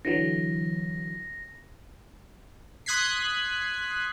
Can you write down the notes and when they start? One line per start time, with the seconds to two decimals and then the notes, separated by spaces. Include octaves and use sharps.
0.05 D3 E3 F#3 A#6
2.86 C6 D#6 F#6 G#6 B6 C7